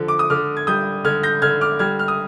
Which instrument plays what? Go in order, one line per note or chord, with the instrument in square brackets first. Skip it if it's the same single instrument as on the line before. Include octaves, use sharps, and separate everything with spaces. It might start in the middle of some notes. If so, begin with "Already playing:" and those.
Already playing: [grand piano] D3 F3
D6
D#6
D3 D6 F6
G#6
G3 D#6 G6
D3 F6 G#6
G6 A#6
D3 F6 G#6
D6 F6
G3 F6 G#6
F6
D#6